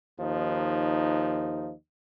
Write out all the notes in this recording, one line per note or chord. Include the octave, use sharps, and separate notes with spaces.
D#2 F3 D#4